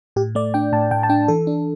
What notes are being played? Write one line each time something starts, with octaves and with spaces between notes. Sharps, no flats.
A2 G4
A3 D5
D4 G5
A2 A5
A2 G5
A5
D4 G5
E3 A4
D4